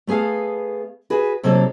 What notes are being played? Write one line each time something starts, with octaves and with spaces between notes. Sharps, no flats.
A3 B3 G#4 A4 F5
F#4 G#4 B4
C3 F#3 A#3 D#4 A4